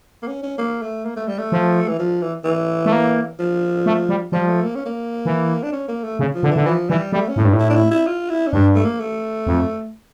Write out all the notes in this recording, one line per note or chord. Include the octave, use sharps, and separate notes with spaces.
A#3
C#4
C#4
A#3
A3
A#3
A3
G3
A3
F3
E3
F3
E3
E3
A3
A#3
F3
A3
G3
F3 G3
A3
A#3
C#4
A#3
E3
D4
C#4
A#3
A3
C#3
F3
D3
E3
D3
E3 F3
E3 G3
G3 A3
C#4
A2
G2
A2
E4
D4
E4
E4
F4
E4
C#4
G2 D4
A3
A#3
A3
F2